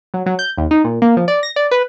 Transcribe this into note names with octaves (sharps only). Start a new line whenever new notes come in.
F#3
F#3
G6
D#2
D#4
A#2
A#3
F3
D5
A#6
D5
B4